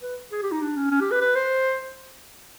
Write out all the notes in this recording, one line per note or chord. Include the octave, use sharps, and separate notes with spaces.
B4
G#4
G4
D#4
D4
C#4
C#4
G4
B4
B4
C5